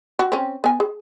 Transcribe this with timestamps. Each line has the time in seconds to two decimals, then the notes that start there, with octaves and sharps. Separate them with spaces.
0.19 F#4
0.32 C4 C#4
0.64 B3 G#5
0.80 G#4